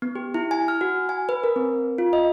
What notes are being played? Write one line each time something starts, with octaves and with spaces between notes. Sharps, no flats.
B3
G4
E4
G#5
F6
F#4
G#5
B4
A#4
C4
F4
D#5